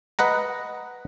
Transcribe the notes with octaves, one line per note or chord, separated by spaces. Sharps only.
B4 D#5 F#5 A#5